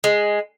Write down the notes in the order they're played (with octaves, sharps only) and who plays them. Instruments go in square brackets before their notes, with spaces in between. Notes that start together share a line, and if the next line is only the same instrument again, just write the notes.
[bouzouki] G#3